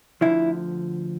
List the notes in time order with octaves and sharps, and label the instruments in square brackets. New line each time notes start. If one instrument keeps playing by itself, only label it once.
[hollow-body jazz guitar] D2 D3 F3 E4